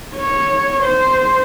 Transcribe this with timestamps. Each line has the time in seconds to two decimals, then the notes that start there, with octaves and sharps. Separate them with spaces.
0.15 C#5
0.83 C5